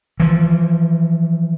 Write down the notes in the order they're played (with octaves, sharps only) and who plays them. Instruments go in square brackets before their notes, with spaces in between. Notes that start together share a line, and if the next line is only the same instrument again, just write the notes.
[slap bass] E3 F3